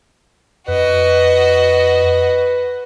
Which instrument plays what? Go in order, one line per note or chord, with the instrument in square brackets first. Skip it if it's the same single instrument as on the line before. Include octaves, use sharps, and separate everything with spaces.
[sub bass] F2 [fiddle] F#4 D#5 [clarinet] B4